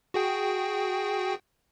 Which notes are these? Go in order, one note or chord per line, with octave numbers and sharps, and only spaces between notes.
F#4 G#4 G5